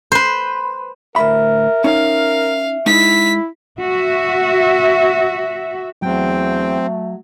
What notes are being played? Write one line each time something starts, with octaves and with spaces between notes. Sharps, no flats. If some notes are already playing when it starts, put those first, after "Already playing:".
B4 C5
D2 A2 A#4 E5 B5
C#4 D#4 A#4 F5
G#3 D#4 E4 B6
F#4 E5
E2 F#3 A3 C4 G5